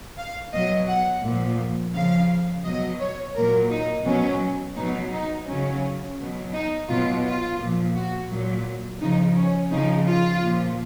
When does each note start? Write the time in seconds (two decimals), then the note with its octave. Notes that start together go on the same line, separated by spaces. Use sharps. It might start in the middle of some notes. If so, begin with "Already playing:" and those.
0.18 F5
0.53 B2 F#3 D#5
0.88 F#5
1.23 A#2 F3
1.94 C#3 F3 F5
2.65 B2 F#3 D#5
3.00 C#5
3.35 A#2 F#3 A#4
3.70 D#4
4.06 B2 F#3 C#4
4.76 B2 F#3 D#4
5.12 D#4
5.47 C#3 F#3 C#4
6.18 B2 F#3
6.53 D#4
6.89 B2 F#3 F4
7.24 F4
7.60 A#2 F3
7.95 F#4
8.30 A#2 F#3
9.01 C#3 F3 D#4
9.36 C#4
9.71 C#3 F3 D#4
10.07 F4
10.43 A#2 F3